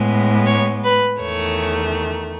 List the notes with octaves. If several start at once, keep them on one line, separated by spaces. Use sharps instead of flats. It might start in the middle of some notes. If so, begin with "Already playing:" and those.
Already playing: A2 G#3 B3
C#5
B4
E2 D#3 A3 C#5